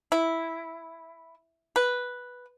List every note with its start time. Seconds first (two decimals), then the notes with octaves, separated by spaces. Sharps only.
0.12 E4
1.76 B4